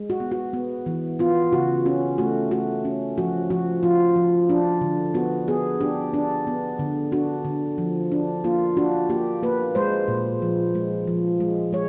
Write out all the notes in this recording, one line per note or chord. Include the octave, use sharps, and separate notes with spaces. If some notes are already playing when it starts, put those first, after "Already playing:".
Already playing: G#3
F#4
B3
F#4
B3
E3
B3 F4
C#3 F#4
C#4 F#4
A3 F#4
A3 F#4
C#4
F3 F#4
F3 F#4
F3 F4
F3
D4
D3
B3 F#4
B3 G#4
D4 G4
D4
B3
D3
D4 F#4
D3
F3
D4
A#3 F4
D4 F#4
A#3 G4
A#3 B4
G#3 C5
A#2
F3
G#3
F3
G#3
G#3 C#5